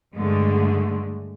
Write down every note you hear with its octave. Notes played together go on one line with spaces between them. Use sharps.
G2 D3 G#3 A3